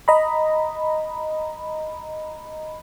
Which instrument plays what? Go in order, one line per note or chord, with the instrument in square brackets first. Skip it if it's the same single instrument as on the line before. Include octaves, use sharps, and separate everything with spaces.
[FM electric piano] D#5 A#5 B5